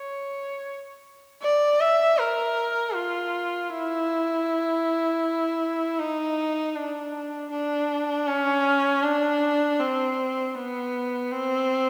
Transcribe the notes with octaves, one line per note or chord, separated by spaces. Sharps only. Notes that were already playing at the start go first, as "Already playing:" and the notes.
Already playing: C#5
D5
E5
A#4
F4
E4
D#4
D4
D4
C#4
D4
C4
B3
C4